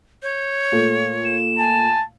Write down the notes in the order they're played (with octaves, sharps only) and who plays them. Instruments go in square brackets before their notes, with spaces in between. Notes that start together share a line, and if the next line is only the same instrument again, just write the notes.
[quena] C#5 [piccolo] G6
[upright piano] A#2 A3
[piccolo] E7
[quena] G#5 [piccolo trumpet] A5